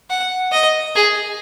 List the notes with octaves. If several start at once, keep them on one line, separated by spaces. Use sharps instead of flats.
F#5
D#5
G#4